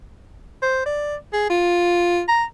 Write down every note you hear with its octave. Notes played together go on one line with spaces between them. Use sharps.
C5
D5
G#4
F4
A#5